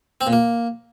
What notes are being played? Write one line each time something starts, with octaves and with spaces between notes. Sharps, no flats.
C4
A#2
A#3